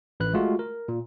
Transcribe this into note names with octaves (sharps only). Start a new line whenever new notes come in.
A1 B4 F#6
G#3 A3 F4 F#4
A#4
A#2